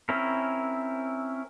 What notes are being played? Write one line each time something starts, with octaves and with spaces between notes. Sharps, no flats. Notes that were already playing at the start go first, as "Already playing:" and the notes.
C4 C#4 E4 A#4